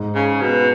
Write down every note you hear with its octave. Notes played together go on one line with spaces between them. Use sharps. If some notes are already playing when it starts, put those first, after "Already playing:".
Already playing: G#2
C#3
B2